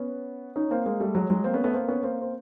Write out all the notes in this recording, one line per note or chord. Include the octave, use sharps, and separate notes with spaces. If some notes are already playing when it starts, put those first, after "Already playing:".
Already playing: B3 C#4
C#4 D#4
A#3 C4
G#3 A#3
G3 A3
F#3 G#3
F#3 G#3
A#3 C4
B3 C#4
A3 B3
A#3 C4
B3 C#4
A#3 C4
C4